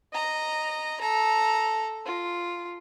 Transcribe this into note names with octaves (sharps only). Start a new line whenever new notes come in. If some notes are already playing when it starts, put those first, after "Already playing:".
D#5 A#5
A4 A#5
F4